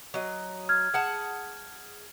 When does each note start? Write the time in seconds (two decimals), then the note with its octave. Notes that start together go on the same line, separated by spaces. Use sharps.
0.14 F#3 D#5
0.69 F6 G#6
0.94 G#4 F#5 A5